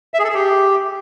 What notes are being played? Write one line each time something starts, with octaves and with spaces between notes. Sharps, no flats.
E5
G#4
A4
G#4
G4